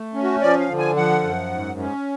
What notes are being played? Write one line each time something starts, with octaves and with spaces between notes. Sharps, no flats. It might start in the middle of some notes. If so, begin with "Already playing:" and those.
Already playing: A3
C#4
F#4
F3 D5
F5
D3
G#5
F3 F#5
F#2
G#2
C#4